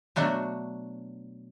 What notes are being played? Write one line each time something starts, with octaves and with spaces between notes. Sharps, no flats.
B2 F#3 A3 D4 F#4